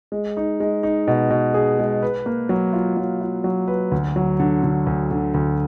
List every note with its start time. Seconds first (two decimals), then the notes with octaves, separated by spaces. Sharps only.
0.12 G#3
0.37 D#4
0.60 G#3
0.83 D#4
1.07 B2
1.30 B2
1.54 G#4
1.79 G#3
2.02 B4
2.26 A#3
2.49 F#3
2.73 F4
2.97 F#3
3.21 F4
3.44 F#3
3.68 B4
3.92 D2
4.16 F#3
4.40 D3
4.63 D3
4.87 D2
5.11 D3
5.34 D2